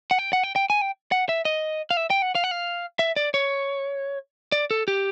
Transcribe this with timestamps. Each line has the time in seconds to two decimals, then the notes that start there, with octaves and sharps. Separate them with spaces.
0.11 F#5
0.19 G5
0.33 F#5
0.44 G5
0.56 G5
0.70 G#5
0.81 G5
1.12 F#5
1.29 E5
1.45 D#5
1.91 F5
1.97 E5
2.10 G5
2.22 F#5
2.35 F5
2.44 F#5
2.51 F5
2.99 E5
3.16 D5
3.34 C#5
4.52 D5
4.71 A4
4.88 G4